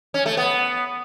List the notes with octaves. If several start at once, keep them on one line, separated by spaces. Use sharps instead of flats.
C#4
A3
B3